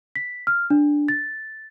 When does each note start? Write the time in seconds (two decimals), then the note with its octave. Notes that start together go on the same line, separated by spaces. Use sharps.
0.16 B6
0.47 F6
0.70 D4
1.08 A6